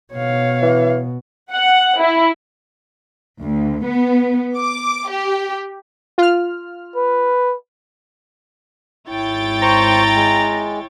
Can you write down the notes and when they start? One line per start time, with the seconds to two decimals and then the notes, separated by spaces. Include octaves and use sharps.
0.14 B2 C#5 F5
0.62 E3
1.52 F#5
1.99 E4
3.42 D2
3.85 B3
4.57 D6
5.09 G4
6.18 F4 F6
6.96 B4
9.09 G#1 E4 C#5 G5 A6
9.62 C5 A#5 C#6
10.16 G#3